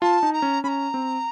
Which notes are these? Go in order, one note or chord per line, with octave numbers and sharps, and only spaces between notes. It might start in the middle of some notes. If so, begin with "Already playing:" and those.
F4 A5
D#4
A#5
C#4
C#4 A#5 B5
C4